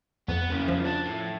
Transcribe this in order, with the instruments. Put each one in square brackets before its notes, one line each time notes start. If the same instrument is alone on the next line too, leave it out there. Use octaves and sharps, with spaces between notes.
[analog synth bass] F2 [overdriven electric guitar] B3
[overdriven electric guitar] C#3 A#3
[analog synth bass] F3
[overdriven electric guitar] D4
A2